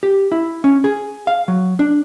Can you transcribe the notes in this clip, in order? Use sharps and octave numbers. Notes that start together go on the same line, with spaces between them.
G4
E4
C#4
G#4
F5
F#3
D4